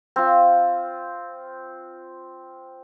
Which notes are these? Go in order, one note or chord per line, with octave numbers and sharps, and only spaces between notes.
C4 F4